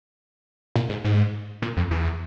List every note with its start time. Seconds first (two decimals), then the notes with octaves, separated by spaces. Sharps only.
0.76 A#2
0.89 G#2
1.05 G#2
1.62 A#2
1.77 F2
1.91 E2